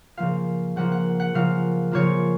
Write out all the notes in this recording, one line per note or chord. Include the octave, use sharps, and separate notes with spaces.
C#3 F3 A#3 F4 F5
C#3 F3 A#3 F4 F#5
F#5
F#5
C#3 F3 A#3 F4 F5
C#3 F3 A#3 F4 C#5